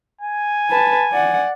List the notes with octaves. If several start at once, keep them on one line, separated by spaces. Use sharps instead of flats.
G#5
B4 A5
D5 F#5